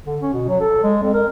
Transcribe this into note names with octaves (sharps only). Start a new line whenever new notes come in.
D3
C#4
B2
F#3
A4
G#3
F2
A#4